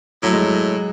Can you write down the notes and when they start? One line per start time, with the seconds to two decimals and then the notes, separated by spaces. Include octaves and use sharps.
0.23 A2 F#3
0.33 G#3
0.43 F#3